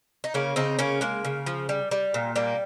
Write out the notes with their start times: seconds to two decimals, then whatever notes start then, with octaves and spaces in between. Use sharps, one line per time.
0.24 D#4
0.34 C#3 A#3 C#4
0.56 C#3 C4 D#4
0.79 C#3 A#3 C#4
1.01 G#3 A#3
1.25 C#3
1.46 F3
1.69 G3
1.91 G3
2.14 A#2
2.36 G3 A#3